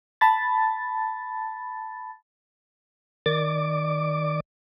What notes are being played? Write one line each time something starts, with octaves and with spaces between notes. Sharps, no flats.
A5 B5 A6
D#3 D5 D6